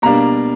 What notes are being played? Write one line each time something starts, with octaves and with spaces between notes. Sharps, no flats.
B2 G3 A#3 D4 A#5